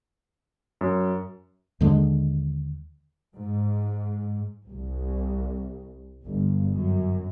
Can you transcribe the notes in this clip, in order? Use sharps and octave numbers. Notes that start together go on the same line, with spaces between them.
F#2
D#2 D3 G#3
G#2
C2
G1
F#2